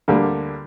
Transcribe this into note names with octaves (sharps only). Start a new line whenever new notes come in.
D2 D3 G3 A#3